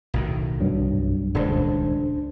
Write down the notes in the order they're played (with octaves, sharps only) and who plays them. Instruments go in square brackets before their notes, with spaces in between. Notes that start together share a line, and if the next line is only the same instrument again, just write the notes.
[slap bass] B1 A2 D#3
[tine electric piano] C2 G2 F#3
[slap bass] D#1 C#2 G2 [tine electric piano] D4 C5